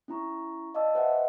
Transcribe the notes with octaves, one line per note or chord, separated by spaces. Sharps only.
C#4 E4 A#5 C#6
D5 D#5 F5 A5 D6 E6
B4 C5 D#5 E5 F#5 G#5